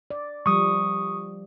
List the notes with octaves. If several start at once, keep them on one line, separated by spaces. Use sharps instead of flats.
D5
F3 G3 C#6 D#6